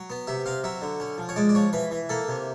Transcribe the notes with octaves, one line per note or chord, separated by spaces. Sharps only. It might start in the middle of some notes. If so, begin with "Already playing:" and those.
Already playing: F#3
B3
C3 E5
C4 F5
F#3 E5
D3
C#4
F3
C#5
G#3 D5
D5
F3 C#5
E3 B4
E3
A#3 A4
C3